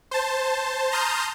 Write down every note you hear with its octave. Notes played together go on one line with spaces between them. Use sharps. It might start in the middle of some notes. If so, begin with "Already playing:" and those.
C5 A5
A5 A#5 C6 D#6 F6 G6